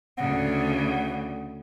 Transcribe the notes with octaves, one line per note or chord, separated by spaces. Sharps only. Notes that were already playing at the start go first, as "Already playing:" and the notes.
D2 C#3 F#5